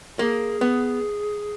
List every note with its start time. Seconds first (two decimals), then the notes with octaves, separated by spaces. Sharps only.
0.19 A#3 G#4
0.61 B3